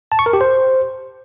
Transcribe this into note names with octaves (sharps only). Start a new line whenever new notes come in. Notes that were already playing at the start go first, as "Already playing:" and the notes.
A5
C#6
A#4
G4
C5